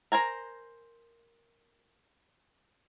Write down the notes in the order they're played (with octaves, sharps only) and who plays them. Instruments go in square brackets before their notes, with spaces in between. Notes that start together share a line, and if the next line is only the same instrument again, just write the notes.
[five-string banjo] A#4 C5 G#5 A#5